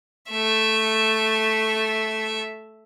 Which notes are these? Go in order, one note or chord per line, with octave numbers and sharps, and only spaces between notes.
A3 E5